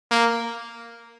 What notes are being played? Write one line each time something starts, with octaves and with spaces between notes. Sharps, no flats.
A#3